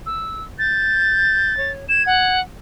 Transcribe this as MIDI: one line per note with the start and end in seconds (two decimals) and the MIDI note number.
0.06 0.44 88
0.59 1.57 91
0.59 1.71 93
1.58 1.86 73
1.89 2.34 92
1.89 2.03 100
2.06 2.41 78